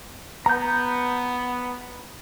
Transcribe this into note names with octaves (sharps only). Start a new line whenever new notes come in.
B3 A#5 G6